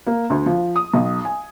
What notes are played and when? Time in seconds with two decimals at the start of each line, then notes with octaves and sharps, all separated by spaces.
0.07 A#3
0.30 D2
0.46 F3
0.76 D#6
0.93 B1
1.25 G#5